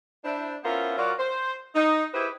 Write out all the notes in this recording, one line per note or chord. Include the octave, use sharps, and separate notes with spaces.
D4 E4 C5
B3 C#4 E4 F4 A#4 C5
F#3 F4 F#4 A#4 D5
C5
D#4
E4 G4 G#4 B4 C5